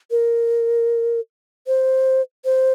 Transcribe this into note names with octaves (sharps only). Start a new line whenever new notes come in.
A#4
C5
C5